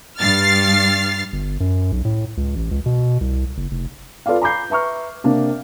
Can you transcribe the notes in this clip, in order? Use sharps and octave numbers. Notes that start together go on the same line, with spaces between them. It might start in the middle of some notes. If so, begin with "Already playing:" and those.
G2 F6 A6 C7
G1
F#2
B1
A2
C#2
A1
C#2
B2
C2
F#1
F1
F4 A4 B4 D5 F5
A#5 B5 D6 G6 C7
B4 E5 A#5 C#6 F6
C3 A#3 D4